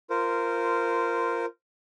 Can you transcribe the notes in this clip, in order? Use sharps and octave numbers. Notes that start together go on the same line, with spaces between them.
F4 A#4 C5